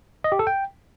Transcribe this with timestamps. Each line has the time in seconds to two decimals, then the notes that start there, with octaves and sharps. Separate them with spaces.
0.24 D#5
0.32 G4
0.39 A4
0.47 G5